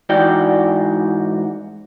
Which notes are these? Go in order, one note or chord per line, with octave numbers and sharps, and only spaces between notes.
G#2 E3 F#4 D5 G5